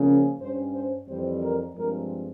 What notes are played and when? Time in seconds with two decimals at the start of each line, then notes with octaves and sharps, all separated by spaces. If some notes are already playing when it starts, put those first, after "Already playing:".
Already playing: C#3 F3 A#3 C#4
0.39 G2 G3 C#4 C5
0.73 C5
1.07 F2 E3 G3 C4 C5
1.42 A#4
1.74 G2 F3 G#3 C4 A#4